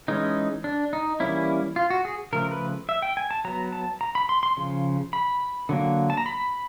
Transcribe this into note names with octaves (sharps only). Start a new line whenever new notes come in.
E3 G#3 C#4 D#4
D4
D#4
E3 G3 A#3 C#4 E4
F4
F#4
G#4
C#3 F3 A3 A#4
B4
E5
G5
G#5
A5
F#3 B3 A#5
A5
A#5
B5
C6
C6
C#3 F3
B5
D3 F#3 A#3
A5
A#5
B5